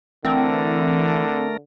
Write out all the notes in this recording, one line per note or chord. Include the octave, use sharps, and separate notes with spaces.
D3 E3 A3 C4 A#4